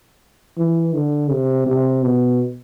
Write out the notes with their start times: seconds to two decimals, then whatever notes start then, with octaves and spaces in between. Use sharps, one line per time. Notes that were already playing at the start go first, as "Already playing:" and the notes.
0.57 E3
0.94 D3
1.31 C3
1.66 C3
2.03 B2